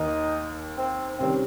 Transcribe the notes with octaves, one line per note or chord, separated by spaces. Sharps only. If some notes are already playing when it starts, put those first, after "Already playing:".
Already playing: D#2 D#3 A#3 D#4
C4
C3 D#3 G3 C4 C#4